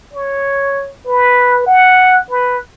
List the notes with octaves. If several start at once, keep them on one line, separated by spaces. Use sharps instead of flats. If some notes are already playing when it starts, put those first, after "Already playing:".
C#5
B4
F#5
B4